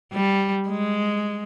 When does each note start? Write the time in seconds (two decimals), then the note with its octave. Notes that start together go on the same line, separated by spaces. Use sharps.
0.13 G3
0.69 G#3